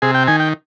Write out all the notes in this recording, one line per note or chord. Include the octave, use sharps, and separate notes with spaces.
C3 G#4
G5
D#3 G#5
G5